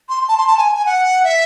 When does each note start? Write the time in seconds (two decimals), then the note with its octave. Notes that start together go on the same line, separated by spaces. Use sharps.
0.09 C6
0.28 A5
0.37 C6
0.47 A5
0.57 G#5
0.76 G#5
0.85 F#5
1.24 E5